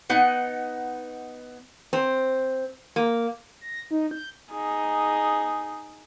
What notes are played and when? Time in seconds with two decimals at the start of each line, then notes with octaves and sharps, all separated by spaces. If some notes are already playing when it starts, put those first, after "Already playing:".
0.10 B3 D#4 F#5
1.93 C4
2.96 A#3
3.61 A#6
3.91 D#4
4.11 G6
4.51 D#4 G#4